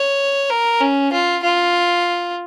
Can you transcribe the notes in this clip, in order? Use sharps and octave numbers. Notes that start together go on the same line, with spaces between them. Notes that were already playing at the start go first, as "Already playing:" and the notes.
Already playing: C#5
A#4
C#4
F4
F4